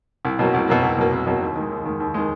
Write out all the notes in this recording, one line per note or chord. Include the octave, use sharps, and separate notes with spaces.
C2
B2 F#3 A#3
C2
B2 F#3 A#3
C2
B2 F#3 A#3
C2
B2 F#3 A#3
D#2
D#3 G#3
D#2
D#3 G#3
D#2
D#3 G#3